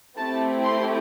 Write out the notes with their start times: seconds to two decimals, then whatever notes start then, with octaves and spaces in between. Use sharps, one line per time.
0.18 A3 C4 E4 G4 A5
0.64 C6